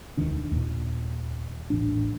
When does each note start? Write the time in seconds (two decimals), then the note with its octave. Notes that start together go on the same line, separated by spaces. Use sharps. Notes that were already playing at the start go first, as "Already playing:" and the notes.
0.17 E1 D2 D#3 D4
0.51 D#2 A#2
1.70 D#1 A1 D4